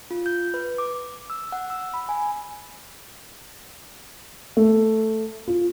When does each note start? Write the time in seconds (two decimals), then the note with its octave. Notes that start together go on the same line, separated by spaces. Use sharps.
0.11 F4
0.26 G6
0.54 B4
0.78 D6
1.30 E6
1.52 F#5
1.70 E6
1.94 B5
2.09 G#5
4.57 A3
5.48 F4